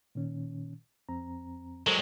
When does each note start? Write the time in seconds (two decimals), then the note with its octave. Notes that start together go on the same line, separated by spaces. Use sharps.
0.15 A#2 D#3 C#4
1.09 F2 C4 A#5
1.87 F#3 G#3 A4 A#4 C5